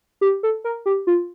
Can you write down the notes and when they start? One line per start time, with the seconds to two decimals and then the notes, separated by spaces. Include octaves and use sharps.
0.21 G4
0.43 A4
0.64 A#4
0.86 G4
1.07 F4